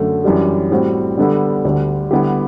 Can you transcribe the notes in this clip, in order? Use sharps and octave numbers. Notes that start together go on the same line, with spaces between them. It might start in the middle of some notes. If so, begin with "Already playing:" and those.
Already playing: F#2 D3 A3
F#2 E3 G3 D4 G4
A2 G3 C4 F#4
D3 G3 B3 D4 A4
D2 D3 G3
D3 G3 B3 E4 G4